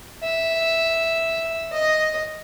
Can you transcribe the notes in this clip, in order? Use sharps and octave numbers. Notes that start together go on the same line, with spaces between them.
E5
D#5